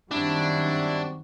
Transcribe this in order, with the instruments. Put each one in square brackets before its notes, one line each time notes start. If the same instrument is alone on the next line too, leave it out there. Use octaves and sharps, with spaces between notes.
[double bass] F#2 D#3 [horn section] G3 C4 F#4 [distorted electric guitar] D4 [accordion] E4